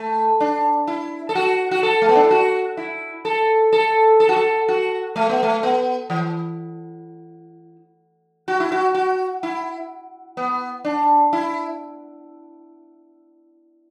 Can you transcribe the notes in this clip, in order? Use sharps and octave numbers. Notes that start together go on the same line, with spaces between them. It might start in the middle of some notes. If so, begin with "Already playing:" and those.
Already playing: A3
D4
E4
A4
F#4
F#4
A4
A3
B3
D4
E4
F#4
E4
A4
A4
A4
F#4
A4
F#4
A3
B3
A3
B3
E3
F#4
E4
F#4
F#4
E4
B3
D4
E4